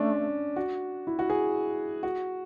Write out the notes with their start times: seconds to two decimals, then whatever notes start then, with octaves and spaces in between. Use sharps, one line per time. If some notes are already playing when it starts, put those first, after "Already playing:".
Already playing: A3 C#4 D4
0.56 F#4
1.07 E4
1.19 F#4
1.30 G#4
2.03 F#4